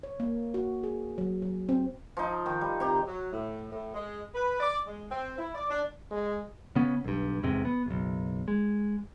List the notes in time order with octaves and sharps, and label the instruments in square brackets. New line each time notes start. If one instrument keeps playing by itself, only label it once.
[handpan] C#5
A#3
F#4
G#4
F#3
F#3
C4
[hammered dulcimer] F3 D#4
D#3
G3
C3 G4 A#5
[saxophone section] F#3
A2
A2
G#3
B4
D5
G#3
C4
E4
D5
D4
[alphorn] G#3
[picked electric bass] C#3 B3 C#4
B1 G2
E2 G#2 C3 G#3
B3
F#1 B1
G#3